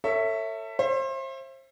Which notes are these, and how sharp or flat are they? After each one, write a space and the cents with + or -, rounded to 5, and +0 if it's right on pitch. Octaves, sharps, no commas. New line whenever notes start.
A4 +35 C#5 +0 E5 +0
C5 +35 E5 +30